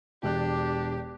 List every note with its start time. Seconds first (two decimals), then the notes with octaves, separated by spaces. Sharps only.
0.23 E1 D4 G4 F#6